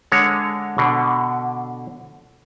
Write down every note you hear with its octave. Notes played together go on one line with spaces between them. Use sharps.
D3 G#3 C#5
B2 D3